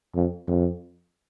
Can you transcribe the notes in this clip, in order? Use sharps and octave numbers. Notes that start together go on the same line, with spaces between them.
F2
F2